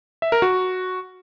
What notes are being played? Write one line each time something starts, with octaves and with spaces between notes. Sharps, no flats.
E5
A#4
F#4